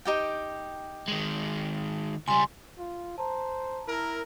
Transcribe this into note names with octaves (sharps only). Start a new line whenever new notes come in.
D#4 G4 G5
D#3 G#3
C#2 G3 G#5 C6
F4
C5 A5 A#5
E4 A#4